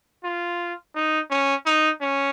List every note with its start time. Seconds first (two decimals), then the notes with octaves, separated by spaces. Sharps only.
0.24 F4
0.95 D#4
1.30 C#4
1.66 D#4
2.01 C#4